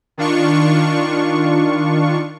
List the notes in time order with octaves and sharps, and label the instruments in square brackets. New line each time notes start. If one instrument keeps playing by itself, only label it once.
[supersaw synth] D#3 D4 F4 C#6